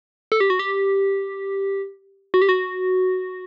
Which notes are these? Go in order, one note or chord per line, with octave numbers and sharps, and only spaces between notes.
A4
G4
F#4
G4
F#4
G4
F#4